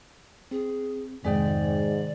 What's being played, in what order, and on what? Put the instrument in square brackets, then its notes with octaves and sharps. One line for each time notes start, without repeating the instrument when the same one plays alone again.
[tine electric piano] C4 [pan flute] G#4
[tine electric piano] F2 G#4 G5 [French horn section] G#2 [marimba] C3 D#3 G#3 [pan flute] D5